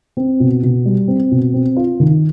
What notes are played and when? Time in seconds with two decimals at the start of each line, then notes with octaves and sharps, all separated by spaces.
0.17 C4
0.40 B2
0.63 B2
0.86 G3
1.08 C4
1.31 B2
1.54 C4
1.76 F4
2.00 D#3